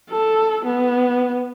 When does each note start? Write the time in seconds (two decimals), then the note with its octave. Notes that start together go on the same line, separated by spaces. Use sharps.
0.11 A4
0.65 B3